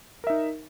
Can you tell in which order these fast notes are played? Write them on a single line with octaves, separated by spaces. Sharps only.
A#4 E5 D#4